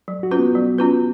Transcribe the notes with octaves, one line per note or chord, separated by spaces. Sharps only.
F#3
F#4
C#4 F4 B4
B3
F#3
C#4 F4 B4